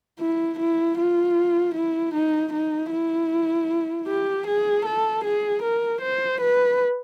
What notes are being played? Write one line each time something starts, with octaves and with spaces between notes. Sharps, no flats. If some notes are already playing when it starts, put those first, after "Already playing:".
E4
E4
F4
E4
D#4
D#4
E4
G4
G#4
A4
G#4
A#4
C5
B4